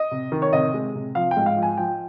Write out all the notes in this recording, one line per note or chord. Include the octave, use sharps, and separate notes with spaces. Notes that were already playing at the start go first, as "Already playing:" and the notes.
Already playing: D#5
C3
D#3
C#5
C3 D#5
G#3
C3
F3 F5
G5
G#2
F5
F3
G#5
F3 G5